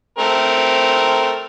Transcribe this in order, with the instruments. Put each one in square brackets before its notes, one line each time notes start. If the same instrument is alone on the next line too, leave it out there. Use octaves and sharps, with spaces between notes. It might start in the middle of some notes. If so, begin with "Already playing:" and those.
[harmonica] A3 C4 A#4